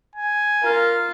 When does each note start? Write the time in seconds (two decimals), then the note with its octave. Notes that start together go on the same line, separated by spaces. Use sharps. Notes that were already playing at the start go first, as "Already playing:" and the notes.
0.16 G#5
0.64 F4 A#4